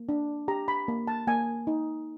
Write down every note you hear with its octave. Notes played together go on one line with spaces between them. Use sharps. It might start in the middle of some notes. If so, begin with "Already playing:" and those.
Already playing: A#3
D4
G4 A#5
B5
A#3
A5
A#3 G#5
D#4